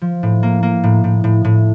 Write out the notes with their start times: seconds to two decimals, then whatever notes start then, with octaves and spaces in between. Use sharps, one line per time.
0.02 F3
0.23 A2
0.43 A#3
0.63 A#3
0.84 A2
1.04 A2
1.24 A2
1.45 A2